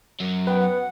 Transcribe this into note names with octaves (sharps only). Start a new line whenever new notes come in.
F#2 F#3
B3 B4 G5
F#5